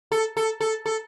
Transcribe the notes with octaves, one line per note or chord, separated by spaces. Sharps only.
A4
A4
A4
A4